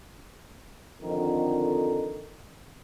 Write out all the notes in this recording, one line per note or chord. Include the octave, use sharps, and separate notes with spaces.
F2 D3 D#3